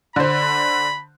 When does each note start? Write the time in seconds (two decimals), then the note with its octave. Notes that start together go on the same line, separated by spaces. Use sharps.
0.16 D3 C5 B5